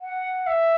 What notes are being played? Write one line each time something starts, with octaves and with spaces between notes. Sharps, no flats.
F#5
E5